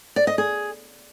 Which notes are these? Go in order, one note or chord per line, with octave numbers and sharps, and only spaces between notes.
D5
D#5
G#4